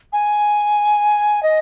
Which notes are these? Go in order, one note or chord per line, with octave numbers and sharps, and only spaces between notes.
G#5
D#5